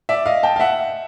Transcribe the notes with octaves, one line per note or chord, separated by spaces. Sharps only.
D5 E5
D#5 F5
G5 A5
F5
E5 F#5